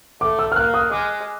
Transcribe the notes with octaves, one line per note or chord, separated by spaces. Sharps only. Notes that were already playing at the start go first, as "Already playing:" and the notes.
A3 D6
E6
F6
A#3 F#6
D#6
G#3 D6